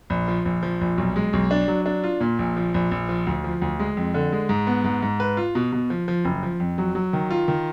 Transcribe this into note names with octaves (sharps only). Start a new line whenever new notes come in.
A#1
F3
A#1
F3
A#1
B1
G#3
B1
D4
F#3
D4
F4
A#2
A#1
F3
A#1
A#1
F3
D2
F3
D2
G#3
F2
D3
G#3
G#2
B3
G#2
G#2
B4
F4
B2
B2
F3
F3
F#1
F3
F2
F#3
F#3
D#3
F4
D#3